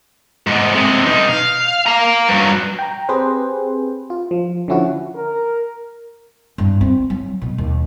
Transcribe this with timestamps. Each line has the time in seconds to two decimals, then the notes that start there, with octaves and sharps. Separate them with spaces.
0.47 G#2 B2
0.75 C3 G#3
1.06 B2 D#4
1.28 F5
1.86 F5 A#5
2.29 G2 F#3
2.79 G5 A#5
3.09 C4 G4 G#4 B4 C5
4.10 F4
4.31 F3
4.68 D3 F3 C#4 E4 F#4
5.15 A#4
6.58 G2
6.81 C4
7.10 F#3
7.42 B2
7.58 D#2